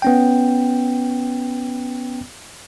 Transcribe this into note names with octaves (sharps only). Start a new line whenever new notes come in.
B3 C#4 G5